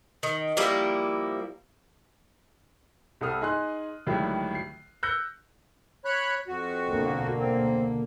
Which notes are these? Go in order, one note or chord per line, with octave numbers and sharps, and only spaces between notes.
D#3
F3 G3 A#3 E4
C2 G3 A4 D#6 F6
D#4 G#4 C6 F#6
C#2 A2 D3 D#3 F#3 G3
C7
E6 F#6 G6 A#6 C#7
C#5 B5 F#6
F2 F#4
B2 D3 A#3
C4